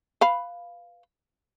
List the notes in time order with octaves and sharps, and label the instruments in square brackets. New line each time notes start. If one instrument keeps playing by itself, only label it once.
[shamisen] B4 F5 B5